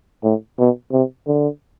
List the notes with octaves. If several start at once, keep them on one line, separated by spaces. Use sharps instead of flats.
A2
B2
C3
D3